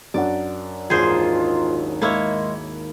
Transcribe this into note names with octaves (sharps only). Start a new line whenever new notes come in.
F#2 D4 D5 F#5
G#1 D#2 F4 G#4 C5
D#3 G#3 A#3 E4 C#5